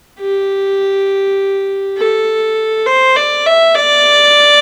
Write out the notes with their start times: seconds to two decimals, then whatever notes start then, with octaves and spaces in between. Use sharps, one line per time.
0.20 G4
1.98 A4
2.86 C5
3.16 D5
3.46 E5
3.75 D5